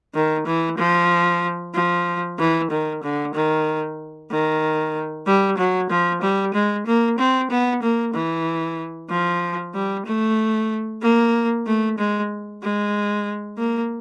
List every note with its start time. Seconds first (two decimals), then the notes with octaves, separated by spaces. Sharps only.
0.15 D#3
0.46 E3
0.78 F3
1.74 F3
2.39 E3
2.71 D#3
3.03 D3
3.34 D#3
4.31 D#3
5.27 G3
5.58 F#3
5.90 F3
6.22 G3
6.54 G#3
6.86 A#3
7.18 C4
7.50 B3
7.82 A#3
8.14 E3
9.10 F3
9.74 G3
10.06 A3
11.02 A#3
11.66 A3
11.98 G#3
12.62 G#3
13.57 A#3